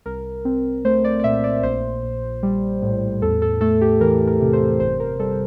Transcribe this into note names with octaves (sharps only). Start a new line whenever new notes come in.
C2 A#4
C4
A3 C5
D5
D5
A#2 E5
D5
A#1 C5
A#1
G3
A2
E2 A4
A4
A3 A4
G4
E3 A#4
A#4
C3
C5
G1 C5
A#4
G3 A4